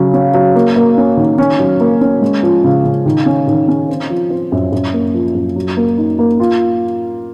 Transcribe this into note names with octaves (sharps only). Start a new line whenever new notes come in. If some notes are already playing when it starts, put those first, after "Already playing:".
Already playing: C#3 F#3
C#4
F#3
A#3
A#3
C#4
D#3
C#4
F#3
A#3
C#4
G#3
F3
C#3
C#3
D#3
C#4
D#3
C#4
C4
F3
C4
F#2
F#2
A#3
F3
F#2
F#3
A#3
D#4
A#3
F4